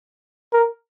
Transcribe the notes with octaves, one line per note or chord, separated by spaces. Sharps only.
A#4